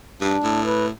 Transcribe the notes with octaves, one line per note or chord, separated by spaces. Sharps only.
G2 D4
A2
B4